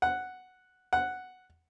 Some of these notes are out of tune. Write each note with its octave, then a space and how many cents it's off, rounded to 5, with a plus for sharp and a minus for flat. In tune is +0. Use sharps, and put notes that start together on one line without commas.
F#5 +0
F#5 +0